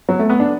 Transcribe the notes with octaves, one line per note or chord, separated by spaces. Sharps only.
F#3
A3
B3
D4